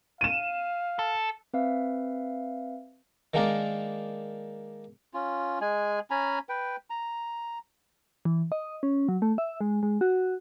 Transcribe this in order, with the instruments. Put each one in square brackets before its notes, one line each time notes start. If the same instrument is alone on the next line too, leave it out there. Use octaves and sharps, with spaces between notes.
[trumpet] F5 [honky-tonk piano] D#7 E7
[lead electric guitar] A4
[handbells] C4 B4 E5 F5
[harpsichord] D#3 G#3 A#3 D4 A#4 D5
[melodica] C#4 F4
G#3 G#5
C#4 G#5 A#5 B5
B4 G5
A#5
[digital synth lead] E3
D#5
C#4
F#3
A3
E5
G#3
G#3
F#4